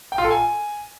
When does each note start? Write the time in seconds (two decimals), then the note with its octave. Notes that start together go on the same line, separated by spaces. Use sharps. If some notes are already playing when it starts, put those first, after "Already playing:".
0.12 G5
0.18 F4
0.24 A4
0.31 G#5